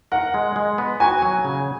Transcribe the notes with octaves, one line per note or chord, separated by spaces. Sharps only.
A#4 F#5
G#3
G#3
B3
F#4 G#5
F#3
C#3